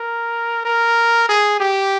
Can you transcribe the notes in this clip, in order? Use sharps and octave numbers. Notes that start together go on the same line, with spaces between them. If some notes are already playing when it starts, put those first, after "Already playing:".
Already playing: A#4
A#4
G#4
G4